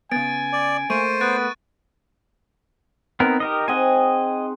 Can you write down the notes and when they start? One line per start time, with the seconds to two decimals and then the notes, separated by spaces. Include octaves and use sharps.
0.12 C#3 B3 G#5 A6 D7
0.53 D5
0.90 A3 A#3 C5 C#6 D7 D#7
1.21 B3 F#6 A6 D7
3.20 B3 C4 D#4 A#4
3.40 G4 A#4 D#5
3.68 C4 G#4 D#5 F#5 G#5